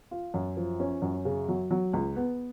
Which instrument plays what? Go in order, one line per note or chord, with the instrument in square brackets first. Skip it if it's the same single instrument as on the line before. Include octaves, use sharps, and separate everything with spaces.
[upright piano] F4
F#2
F3
C#4
F#2
C#3
F#3
F#3
C#2
B3